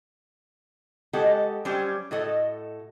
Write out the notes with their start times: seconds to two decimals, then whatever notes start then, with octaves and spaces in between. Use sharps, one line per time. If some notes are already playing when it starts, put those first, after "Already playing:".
1.13 G#3 F#4 G4 A4 D#5 F#5
1.65 F#3 G3 C#4 G4 C5
2.11 A2 F#4 A4 D#5